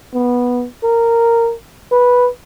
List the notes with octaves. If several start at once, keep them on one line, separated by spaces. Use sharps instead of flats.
B3
A#4
B4